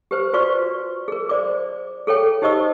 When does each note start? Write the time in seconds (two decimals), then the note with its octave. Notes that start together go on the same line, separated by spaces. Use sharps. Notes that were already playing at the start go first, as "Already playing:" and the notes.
0.11 G4 B4 C5
0.33 F4 F#4 B4 C5 D5 C#6
1.08 G#4 A#4
1.29 C5 D5 D6
2.07 G#4 A4 C#5 G5
2.42 D#4 G4 C5 D#5 C#6 E6